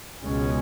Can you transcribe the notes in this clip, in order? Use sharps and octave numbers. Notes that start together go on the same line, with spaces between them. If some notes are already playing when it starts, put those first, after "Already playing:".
C#2 B2 G#3 C#4